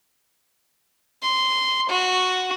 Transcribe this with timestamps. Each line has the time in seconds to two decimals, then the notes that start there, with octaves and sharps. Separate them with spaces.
1.22 C6
1.89 F#4